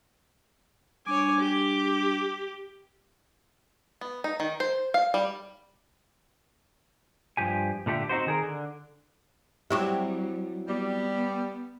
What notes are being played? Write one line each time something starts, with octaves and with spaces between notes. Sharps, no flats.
G3 D4 C#5 G#5 D6
G4
B3
D#4
D#3
C5
F5
G3
G2 A#2 F3 G4 G#5
A#2 D3 A3 G4
C4 D#4 F#4 C5
D#3 G#4 A#4
D3
F#3 G3 C4 E4 G4 C#6 D6
G3 B3